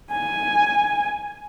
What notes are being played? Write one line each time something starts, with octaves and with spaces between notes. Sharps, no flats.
G#5